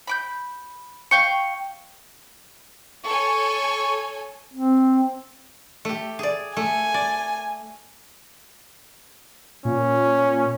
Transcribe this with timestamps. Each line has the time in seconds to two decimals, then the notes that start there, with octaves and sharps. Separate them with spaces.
0.07 B5 D6 G6
1.11 F5 G5 C#6 C#7
3.05 A4 C#5 G#5 C#6
4.54 C4
5.85 A3 G4
6.19 G#4 D5
6.57 A3 G#5
6.94 D5
9.65 A#2 C#4